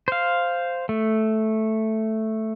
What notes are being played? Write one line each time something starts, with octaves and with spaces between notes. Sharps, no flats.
C5 F5
A3